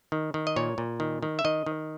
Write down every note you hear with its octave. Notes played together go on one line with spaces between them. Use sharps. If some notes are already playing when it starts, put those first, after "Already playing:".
D#3
D#3
D#5
A#2 C#5
A#2
D#3
D#3
E5
D#3 D#5
D#3